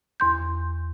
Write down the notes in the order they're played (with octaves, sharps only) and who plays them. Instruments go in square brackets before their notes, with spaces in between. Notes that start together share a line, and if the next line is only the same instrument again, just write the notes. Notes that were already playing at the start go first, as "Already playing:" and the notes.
[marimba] E2 C6 G6